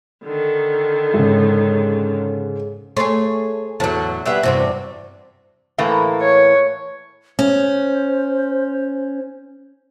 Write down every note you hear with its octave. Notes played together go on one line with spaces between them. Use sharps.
D3 D#3
G#2 C#3
A3 G#4 C#5 C6
E2 A2 D3 F#3 A5
G3 B3 G#4 E5 F#5
E2 G2 C3 C4 F#4
A2 E3 A#3
C#5
C#4 C5